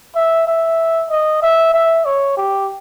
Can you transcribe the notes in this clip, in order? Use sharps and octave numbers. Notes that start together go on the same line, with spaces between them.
E5
E5
D#5
E5
E5
C#5
G4